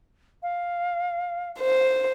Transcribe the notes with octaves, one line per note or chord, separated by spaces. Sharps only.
F5
C5